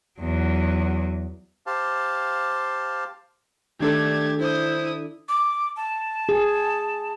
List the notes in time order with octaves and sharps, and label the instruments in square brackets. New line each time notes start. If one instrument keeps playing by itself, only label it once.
[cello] E2 F#3
[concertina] G4 C5 F5 A5
[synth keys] D#3 D4 A4 [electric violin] A3 G#6 [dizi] G4
[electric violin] E4 D#6 [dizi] C5
[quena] D6
A5
[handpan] G#4